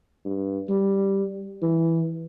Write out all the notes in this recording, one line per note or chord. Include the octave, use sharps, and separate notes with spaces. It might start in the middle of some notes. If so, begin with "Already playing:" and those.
G2
G3
E3